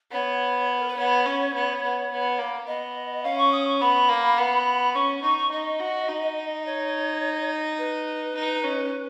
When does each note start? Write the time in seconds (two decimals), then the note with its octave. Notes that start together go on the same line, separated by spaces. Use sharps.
0.11 B3 C#5
0.80 A#4
0.88 B4
0.96 B3 C#5
1.26 C#4
1.54 B3
1.82 B3
2.11 B3
2.39 A#3
2.67 B3 D#5
3.24 C#4 F5
3.38 C#6
3.52 D#6
3.67 C#6
3.80 B3 B5
4.09 A#3
4.38 B3
4.94 C#4 C#6
5.23 D#4 C#6
5.38 C#6
5.51 D#4 D#5
5.79 F#4
6.08 D#4
6.66 C#5
7.78 B4
8.36 D#4
8.64 C#4